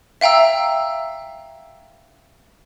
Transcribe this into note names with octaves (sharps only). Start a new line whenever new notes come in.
E5 F5 G5 A#5 E6